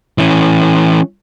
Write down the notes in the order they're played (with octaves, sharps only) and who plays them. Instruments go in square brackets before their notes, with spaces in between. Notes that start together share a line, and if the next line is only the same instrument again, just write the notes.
[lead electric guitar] E3 C#4